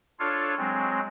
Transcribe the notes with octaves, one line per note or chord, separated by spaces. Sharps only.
D4 F4 A4 C#5 F5
F#3 G#3 C4